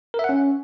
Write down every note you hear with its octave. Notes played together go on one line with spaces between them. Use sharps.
A#4
E5
F#5
C#4